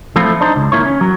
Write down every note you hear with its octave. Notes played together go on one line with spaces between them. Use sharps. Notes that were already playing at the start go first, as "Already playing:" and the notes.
F3 A3 C4 E4 F4
D4 D#4 C5
C#2
D#3 F3 A#3 E4 C#5
C#4
F#3